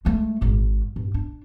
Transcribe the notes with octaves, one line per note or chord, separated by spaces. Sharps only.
G#3 A3
G#1 G#2
G2
D4